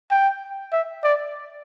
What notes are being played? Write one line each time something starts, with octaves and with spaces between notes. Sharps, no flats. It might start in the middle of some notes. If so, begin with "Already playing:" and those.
G5
E5
D5